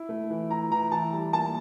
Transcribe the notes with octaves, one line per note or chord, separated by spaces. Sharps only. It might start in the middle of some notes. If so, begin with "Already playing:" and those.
Already playing: E4
A3
E3
E4 A#5
E3 A#5
E3 A5
G3
A#3 A5